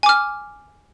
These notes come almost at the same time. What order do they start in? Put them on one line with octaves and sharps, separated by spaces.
G#5 D6 F6